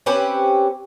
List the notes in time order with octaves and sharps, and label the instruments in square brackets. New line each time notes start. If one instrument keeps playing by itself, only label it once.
[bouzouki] C4 C#4 G4 B4